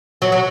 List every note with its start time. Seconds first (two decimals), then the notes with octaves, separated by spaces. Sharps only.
0.22 F#3
0.32 F#3